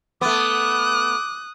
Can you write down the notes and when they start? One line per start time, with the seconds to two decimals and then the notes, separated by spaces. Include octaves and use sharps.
0.21 A3 B3 D6 D#6 F#6